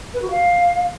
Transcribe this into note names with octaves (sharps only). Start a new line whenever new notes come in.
B4
F#4
F5